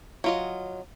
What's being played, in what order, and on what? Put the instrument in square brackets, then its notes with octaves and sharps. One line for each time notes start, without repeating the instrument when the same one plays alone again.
[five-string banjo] F#3 F4 D#5